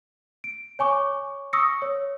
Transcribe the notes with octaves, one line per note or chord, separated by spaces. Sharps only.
D7
C#5 G#5 C#6 D6
C#6 D#6 E6 A#6 C#7
C#5